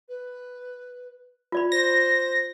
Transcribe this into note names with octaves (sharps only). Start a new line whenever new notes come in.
B4
F4 D5 B5
C5 A#6